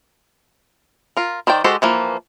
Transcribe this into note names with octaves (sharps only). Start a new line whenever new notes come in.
F4 A#4
D#3 C5 D5 G5
G#3 F#4 G4 A4 C5
E3 F3 A#3